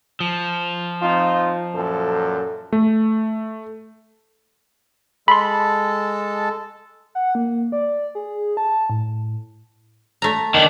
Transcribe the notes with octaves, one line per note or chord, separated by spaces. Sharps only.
F3
C4 D#4 F4
F#2 A#2 A4
A3
G#3 A4 A5 B5 C6
F#5
A#3
D5
G#4
A5
A2
A3 A#5
D#3 D4